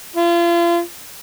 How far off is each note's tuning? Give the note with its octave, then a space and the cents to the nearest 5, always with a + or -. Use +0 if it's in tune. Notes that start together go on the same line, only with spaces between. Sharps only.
F4 -35